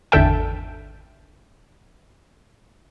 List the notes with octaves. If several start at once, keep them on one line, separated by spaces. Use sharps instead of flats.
G#1 E2 D3 A4 E5 G5